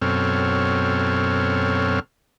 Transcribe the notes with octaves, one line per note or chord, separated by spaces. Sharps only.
F#2 B2 C4 A4 C#5 F6